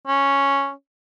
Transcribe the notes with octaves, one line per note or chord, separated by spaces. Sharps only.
C#4